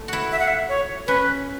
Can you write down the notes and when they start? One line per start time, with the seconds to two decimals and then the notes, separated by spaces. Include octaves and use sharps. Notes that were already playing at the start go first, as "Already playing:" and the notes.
Already playing: A3
0.08 E4 F#4
0.31 E5
0.39 F#5
0.47 E5
0.69 C#5
1.07 C#4 B4